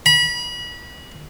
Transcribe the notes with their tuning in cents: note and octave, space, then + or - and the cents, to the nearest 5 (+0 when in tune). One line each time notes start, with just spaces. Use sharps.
B5 -30